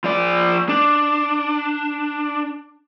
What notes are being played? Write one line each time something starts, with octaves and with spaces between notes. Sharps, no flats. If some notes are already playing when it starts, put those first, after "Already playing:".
F3 D5
D4